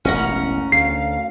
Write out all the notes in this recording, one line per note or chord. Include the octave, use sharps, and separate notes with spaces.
E1 A1 C#4 A#4 F#5
D2 F5 C7